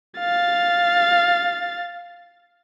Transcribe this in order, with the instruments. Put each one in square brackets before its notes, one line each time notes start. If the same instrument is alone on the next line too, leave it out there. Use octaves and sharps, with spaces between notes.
[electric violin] F5 A6